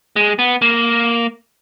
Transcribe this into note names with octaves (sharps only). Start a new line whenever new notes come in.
G#3
B3
A#3